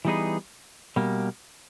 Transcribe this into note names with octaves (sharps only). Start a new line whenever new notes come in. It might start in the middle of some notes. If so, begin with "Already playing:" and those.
E3 G3 B3 D#4 G#4
B2 G3 A#3